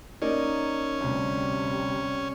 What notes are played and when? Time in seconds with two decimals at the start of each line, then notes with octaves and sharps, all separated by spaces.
0.22 A#3 C#4 D#4 D5
1.00 D2 C3 G3